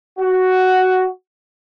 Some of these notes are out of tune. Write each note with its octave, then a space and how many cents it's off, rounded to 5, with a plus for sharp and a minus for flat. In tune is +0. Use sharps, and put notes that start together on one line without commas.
F#4 +5